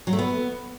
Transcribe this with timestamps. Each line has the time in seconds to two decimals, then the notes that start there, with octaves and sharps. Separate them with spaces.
0.07 F#3
0.13 A3
0.19 B3